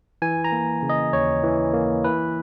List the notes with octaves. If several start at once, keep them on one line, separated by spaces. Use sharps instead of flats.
E3 G#5
A#5
A#3
C#3
D#5
D#2 C#5
E3
A#3
E3 B4